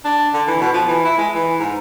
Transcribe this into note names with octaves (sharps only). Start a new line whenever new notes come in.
D4
D3
E3
B2
F3
E3
E4
G#3
E3
G#2